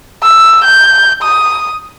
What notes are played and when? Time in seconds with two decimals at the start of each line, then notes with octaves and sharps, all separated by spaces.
0.23 E6
0.64 G6
1.23 D#6